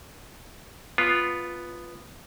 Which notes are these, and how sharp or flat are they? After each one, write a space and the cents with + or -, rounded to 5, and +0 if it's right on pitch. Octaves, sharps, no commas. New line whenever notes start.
B3 +0 F4 +0